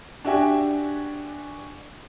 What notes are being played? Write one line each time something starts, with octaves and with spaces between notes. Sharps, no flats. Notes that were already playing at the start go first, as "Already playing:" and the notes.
D4 F#4 G4 E5 G5 G#5